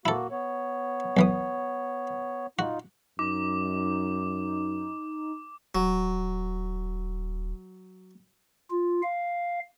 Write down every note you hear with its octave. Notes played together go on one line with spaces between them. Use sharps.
A#3 E4 F#4 A4
B3 C#5
B1 E3 D#6
D#4 F4 F#4
F#2 D#4 D6
D#1 F#3
F4
F5